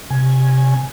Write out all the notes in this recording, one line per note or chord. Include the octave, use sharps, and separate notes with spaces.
C3 G#5